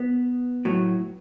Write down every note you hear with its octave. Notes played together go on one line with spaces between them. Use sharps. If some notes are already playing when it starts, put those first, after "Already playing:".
Already playing: B3
A2 F#3